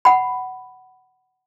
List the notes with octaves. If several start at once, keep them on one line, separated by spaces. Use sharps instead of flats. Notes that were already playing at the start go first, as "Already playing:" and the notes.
F#5 B5